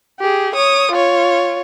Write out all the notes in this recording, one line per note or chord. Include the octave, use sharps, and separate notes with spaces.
G4 G#4
C#5 D#6
F4 C#5